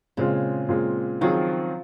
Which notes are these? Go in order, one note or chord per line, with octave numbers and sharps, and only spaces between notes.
A#2 C#3 G#3 C4 F4
A#2 G#3 C4 F4
D#3 F3 F#3 C4 F4 G#4